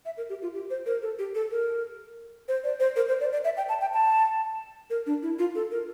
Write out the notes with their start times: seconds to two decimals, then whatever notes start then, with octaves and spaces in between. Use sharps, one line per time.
0.05 E5
0.17 A#4
0.29 G4
0.42 F4
0.54 G4
0.70 C5
0.86 A#4
1.02 A4
1.19 G4
1.35 A4
1.51 A#4
2.48 C5
2.64 D5
2.80 C5
2.96 A#4
3.08 C5
3.21 D5
3.33 D5
3.45 E5
3.57 G5
3.69 A5
3.81 G5
3.94 A5
4.90 A#4
5.06 D4
5.22 E4
5.39 F4
5.55 A4
5.71 A#4